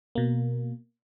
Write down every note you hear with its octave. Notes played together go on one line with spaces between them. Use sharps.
B2 A#3